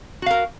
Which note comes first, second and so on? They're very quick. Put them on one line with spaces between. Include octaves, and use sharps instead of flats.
F#4 F5 A#4